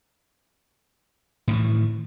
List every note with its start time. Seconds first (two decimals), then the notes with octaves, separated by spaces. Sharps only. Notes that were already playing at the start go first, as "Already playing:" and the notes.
1.48 A2
1.50 D#3
1.53 E3